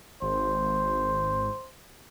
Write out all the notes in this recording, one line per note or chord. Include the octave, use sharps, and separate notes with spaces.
G#1 C5